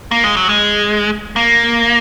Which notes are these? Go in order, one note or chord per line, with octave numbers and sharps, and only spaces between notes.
A#3
G#3
F#3
G#3
A#3